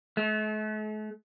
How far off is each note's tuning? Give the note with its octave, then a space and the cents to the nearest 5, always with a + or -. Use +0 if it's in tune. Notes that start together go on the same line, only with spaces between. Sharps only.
A3 -45